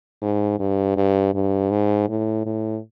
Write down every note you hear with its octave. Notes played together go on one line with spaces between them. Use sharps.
G#2
G2
G2
G2
G#2
A2
A2